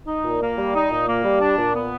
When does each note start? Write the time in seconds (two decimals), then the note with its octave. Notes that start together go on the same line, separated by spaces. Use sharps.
0.07 D#4
0.24 A#2
0.41 A#3
0.58 G3
0.75 D#4
0.91 A#2
1.08 A#3
1.24 G3
1.41 D4
1.58 A#2
1.75 B3